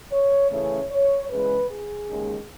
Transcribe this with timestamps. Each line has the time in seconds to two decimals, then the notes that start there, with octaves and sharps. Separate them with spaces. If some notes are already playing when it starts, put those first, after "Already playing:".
0.12 C#5
0.51 C#3 E3 A3 C#4 C#5
0.91 C#5
1.30 E2 C#3 G#3 B4
1.69 G#4
2.08 D#2 C#3 G#3